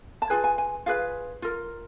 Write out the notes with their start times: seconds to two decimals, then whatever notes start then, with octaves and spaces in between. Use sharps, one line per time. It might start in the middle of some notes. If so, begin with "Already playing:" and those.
0.22 A5
0.30 F4 G#4 B4 G#5
0.44 G#5
0.58 G#5
0.86 F4 G#4 B4 F5
1.42 F4 A#4